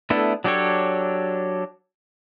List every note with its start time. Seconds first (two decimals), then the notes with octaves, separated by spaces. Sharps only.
0.10 A3 B3 D4 E4 A4
0.44 F#3 D4 G4 A4 C#5